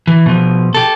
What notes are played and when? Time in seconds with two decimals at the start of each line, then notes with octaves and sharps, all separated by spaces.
0.07 E3
0.26 B2 F3
0.74 G4 A4